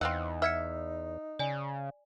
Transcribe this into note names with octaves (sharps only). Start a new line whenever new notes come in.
E2 C4 D#4 F5 F#5 E6
E5 F6 G#6 C#7
C#3 D5 G#5